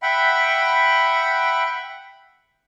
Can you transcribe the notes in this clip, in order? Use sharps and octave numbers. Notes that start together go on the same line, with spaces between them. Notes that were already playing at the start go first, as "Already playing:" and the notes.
E5 F#5 G5 B5